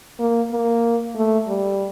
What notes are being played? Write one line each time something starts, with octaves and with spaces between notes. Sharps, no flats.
A#3
A#3
A3
G3